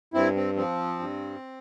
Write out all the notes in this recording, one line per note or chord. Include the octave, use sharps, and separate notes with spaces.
G2 C4 E4
C4
F3 C4
G2